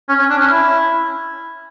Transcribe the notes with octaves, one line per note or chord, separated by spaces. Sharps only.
C#4
C#4
D4
C#4
E4